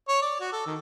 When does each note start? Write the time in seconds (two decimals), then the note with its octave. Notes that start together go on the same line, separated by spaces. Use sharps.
0.08 C#5
0.22 D5
0.40 F#4
0.52 A4
0.66 D#3